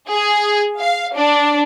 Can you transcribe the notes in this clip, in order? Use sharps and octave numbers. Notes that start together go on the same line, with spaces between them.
G#4
F5
D4